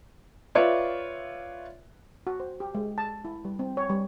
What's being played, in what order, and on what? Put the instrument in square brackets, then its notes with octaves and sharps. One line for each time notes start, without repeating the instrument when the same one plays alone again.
[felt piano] F4 B4 C#5 D5 E5
[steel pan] F#4
C5
G4
G#3
A5
E4
G3
C4
C#5
G3